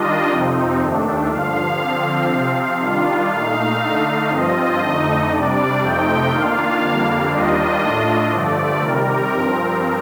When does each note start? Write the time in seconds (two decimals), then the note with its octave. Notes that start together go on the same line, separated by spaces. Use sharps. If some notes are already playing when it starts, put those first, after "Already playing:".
Already playing: D#3 G3 D4 F4 D#5
0.29 F2 C3 F3 C4 D#4
0.79 D#2 D#3 A3 D4
1.30 G2 D3 F3 F5
1.81 D3 F3 C4
2.30 C3 F3 C4
2.80 D#3 G3 D4 F4
3.30 A#2 A3 D#4 F5
3.80 D3 A3 D#4
4.30 G2 F3 C4 F4 D#5
4.80 F2 D3 A3 D#4
5.30 C3 G3 D4 D5
5.80 F2 C3 F3 A3 D#4 G5
6.31 D#3 A#3 D4 F4 F5
6.81 F2 D3 G3 A#3 D4
7.30 D#2 D#3 G3 D4 F4 D#5
7.82 A2 A3 D4 F4
8.31 G2 D3 F3 A3 D5
8.81 C3 D#3 G3 A#4
9.31 G2 F3 C4